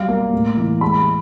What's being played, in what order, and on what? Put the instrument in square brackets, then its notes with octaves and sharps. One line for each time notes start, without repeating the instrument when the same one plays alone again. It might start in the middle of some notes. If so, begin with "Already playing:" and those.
Already playing: [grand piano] F#3 G3 F5
A#3
A2
E3
G#3 B5